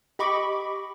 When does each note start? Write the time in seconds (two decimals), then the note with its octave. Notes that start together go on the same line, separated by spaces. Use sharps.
0.19 G4 D#5 B5 C#6 D6